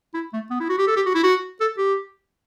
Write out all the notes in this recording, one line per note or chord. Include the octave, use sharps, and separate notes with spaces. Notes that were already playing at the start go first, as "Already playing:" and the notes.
E4
A3
B3
E4
F#4
G4
A4
G4
F#4
E4
F#4
A4
G4